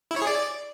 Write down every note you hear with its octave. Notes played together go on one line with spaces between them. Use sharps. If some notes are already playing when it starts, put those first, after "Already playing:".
E4
C#5
G#4
D5